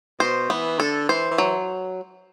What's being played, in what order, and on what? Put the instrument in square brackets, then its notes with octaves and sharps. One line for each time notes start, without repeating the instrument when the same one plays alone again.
[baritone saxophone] B2 [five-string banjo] C5
[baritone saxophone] E3 [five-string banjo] B3
[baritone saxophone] D3 [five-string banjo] A4
[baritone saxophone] E3 [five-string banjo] C5
[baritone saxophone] E3
[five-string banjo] F#3